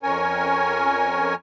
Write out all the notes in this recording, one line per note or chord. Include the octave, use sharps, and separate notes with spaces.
F2 C#4 A#4 C#5 G#5